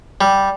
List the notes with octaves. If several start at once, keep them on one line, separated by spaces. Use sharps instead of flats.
G3